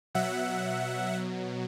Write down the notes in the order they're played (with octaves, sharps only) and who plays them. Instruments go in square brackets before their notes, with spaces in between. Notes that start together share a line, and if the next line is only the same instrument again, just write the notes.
[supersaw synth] B2 F#3 E5 F#5